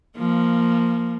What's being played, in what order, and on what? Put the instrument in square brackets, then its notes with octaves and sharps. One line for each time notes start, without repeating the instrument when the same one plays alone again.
[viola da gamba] F3 A#3